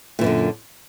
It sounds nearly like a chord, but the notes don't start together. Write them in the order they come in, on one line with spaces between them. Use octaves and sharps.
A#2 E3 F#2 D3